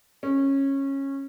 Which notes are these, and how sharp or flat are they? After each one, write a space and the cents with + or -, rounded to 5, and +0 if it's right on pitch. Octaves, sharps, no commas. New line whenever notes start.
C#4 -15